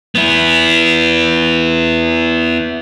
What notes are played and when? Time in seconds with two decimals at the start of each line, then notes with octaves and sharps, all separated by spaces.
0.15 B3 E4